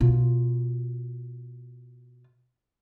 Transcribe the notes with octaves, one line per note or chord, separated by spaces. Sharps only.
B2 F4